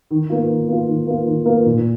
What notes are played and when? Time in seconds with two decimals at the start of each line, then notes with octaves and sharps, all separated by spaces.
0.11 D#3
0.30 A#3 F4
0.50 D#3
0.68 A#3 F4
0.88 D#3
1.07 A#3 F4
1.27 D#3
1.45 A#3 F4
1.66 A#2